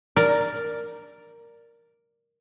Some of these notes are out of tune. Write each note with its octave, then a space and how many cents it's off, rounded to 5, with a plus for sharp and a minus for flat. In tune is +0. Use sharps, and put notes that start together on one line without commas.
A#4 +0 D5 +0